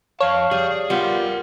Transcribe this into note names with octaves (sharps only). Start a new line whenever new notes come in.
F2 C#5 F5 A5
G3 G#4
G3 B3 F4 A#4 F#5